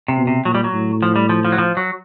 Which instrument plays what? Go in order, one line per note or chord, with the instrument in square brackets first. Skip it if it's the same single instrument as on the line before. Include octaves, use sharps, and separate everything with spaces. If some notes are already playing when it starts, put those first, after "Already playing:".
[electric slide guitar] C3
[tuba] B2
[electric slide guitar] C3
[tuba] A#2 [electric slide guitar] F#3
[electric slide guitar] G3
F#3
[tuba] A2
[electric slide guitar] F3
G3
F3
F3
F#3
F3
F#3